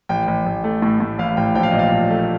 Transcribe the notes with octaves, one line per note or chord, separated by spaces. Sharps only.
A1 G5
A1
A1
A3
A2
A2
A1 F5
A1 G5
A#1 G5
F5
A#2 D#5
F5
A#1
A3